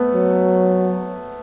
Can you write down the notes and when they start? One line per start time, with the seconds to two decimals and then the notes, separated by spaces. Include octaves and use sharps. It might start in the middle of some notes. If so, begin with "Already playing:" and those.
Already playing: A3 B3
0.14 F#3